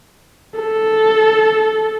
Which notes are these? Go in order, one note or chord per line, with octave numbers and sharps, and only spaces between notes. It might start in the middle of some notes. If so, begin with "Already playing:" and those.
A4